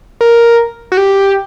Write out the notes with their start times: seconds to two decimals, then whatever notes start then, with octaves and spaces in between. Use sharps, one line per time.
0.21 A#4
0.92 F#4
0.97 G4